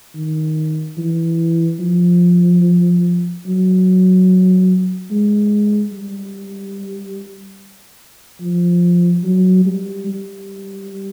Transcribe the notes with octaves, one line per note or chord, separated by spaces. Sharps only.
D#3
E3
F3
F#3
G#3
G3
F3
F#3
G3
G3